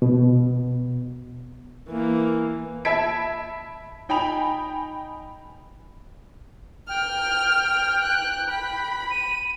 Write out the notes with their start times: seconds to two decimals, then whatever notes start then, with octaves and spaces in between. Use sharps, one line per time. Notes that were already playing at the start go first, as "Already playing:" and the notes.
0.02 B2
1.89 E3 A#3
2.85 E5 A5 B5 G#6 B6 D7
4.09 D#4 G5 G#5 B5 F7
6.88 G5 F6
8.02 F#6
8.50 B5
9.11 D#7